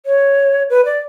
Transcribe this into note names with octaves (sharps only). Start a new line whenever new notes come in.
C#5
B4
D5